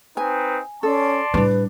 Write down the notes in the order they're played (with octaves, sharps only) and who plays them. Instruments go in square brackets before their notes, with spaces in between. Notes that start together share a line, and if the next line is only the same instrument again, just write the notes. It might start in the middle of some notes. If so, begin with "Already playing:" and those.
[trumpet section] C4 D#4 B4 [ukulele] G#5
[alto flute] C#4 [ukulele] A4 [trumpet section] D5 A5 C6
[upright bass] A2 G3 [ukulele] C#4 D4 [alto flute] B4